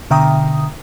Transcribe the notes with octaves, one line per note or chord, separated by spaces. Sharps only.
B2 D3 E5 G5 A#5 D#6